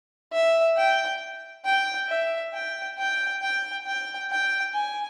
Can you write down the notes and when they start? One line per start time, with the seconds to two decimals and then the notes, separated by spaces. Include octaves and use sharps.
0.33 E5
0.77 G5
1.65 G5
2.09 E5
2.53 G5
2.98 G5
3.42 G5
3.87 G5
4.31 G5
4.74 G#5